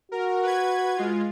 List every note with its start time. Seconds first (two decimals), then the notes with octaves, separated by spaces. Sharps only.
0.12 F#4 A#4
0.43 B4 G#6
0.97 G#3 F4